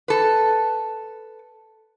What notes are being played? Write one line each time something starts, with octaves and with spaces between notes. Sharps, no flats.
A4 B4